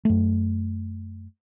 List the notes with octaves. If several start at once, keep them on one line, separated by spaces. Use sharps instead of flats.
F#2 A3